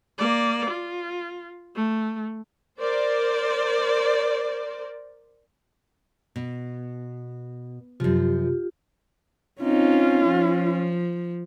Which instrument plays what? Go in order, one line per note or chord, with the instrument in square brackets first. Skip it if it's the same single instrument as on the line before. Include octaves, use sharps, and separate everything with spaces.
[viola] A#3 D5
F4
A3
[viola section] A#4 C5 D5
[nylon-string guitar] B2
[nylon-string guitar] F#2 F3 [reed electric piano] C3 [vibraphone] F4 G4
[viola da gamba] C4 D#4 [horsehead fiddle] C#4 F4
[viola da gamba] F3